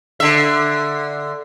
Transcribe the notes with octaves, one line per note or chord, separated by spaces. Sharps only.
D3 E5